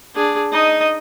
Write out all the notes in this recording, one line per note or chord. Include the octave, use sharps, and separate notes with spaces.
D4 G#4
D#4 D#5